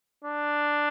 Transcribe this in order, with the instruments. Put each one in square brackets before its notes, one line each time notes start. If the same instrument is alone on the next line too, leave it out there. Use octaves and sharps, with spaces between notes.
[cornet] D4